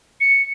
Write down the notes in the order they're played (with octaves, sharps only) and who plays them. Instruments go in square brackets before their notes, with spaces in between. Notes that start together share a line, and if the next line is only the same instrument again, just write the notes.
[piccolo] C#7